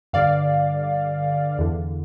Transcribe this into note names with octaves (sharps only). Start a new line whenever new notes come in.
G2 D3 D5 F5
E2 D3